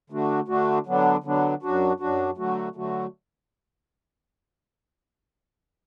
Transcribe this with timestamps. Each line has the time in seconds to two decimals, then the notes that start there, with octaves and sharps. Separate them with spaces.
0.10 D3 A3 D4 F#4
0.48 D3 A3 D4 F#4
0.86 D3 F#3 B3 D4
1.24 D3 F#3 B3 D4
1.63 F#2 F#3 D4 F#4
2.00 F#2 F#3 D4 F#4
2.37 D3 F#3 A3 F#4
2.75 D3 F#3 A3 F#4